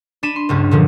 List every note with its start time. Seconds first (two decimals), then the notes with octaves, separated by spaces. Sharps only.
0.23 D4 B5 D#7 E7
0.36 C6
0.49 F#1 C#2 G2
0.71 A#2 D3 F3 F#3